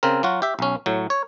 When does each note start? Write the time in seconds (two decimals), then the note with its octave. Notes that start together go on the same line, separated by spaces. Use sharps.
0.03 C#3 C4 A#4
0.23 F#3 F4 F#4
0.42 G4 E5
0.59 B1 C#4
0.86 A2 F#3
1.10 C#5